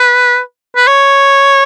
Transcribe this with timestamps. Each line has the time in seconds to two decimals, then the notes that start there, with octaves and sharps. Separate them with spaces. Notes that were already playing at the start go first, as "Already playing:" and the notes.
Already playing: B4
0.76 B4
0.87 C#5